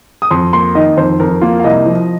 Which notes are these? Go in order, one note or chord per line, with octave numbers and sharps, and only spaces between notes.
D#6
F2 C6
A#3 C6
D#3 D#5
F2 C5
F2 A#4
A#3 F4
F5
C2 D#5
F3